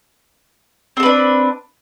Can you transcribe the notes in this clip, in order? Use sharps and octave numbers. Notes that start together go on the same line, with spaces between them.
C4 D4 A4 B4